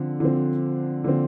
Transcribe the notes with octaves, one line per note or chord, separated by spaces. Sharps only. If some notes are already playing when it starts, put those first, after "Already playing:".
Already playing: D3 F3 C4
D3 F3 C4
D3 F3 C4